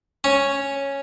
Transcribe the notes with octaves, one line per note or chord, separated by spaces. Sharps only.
C#4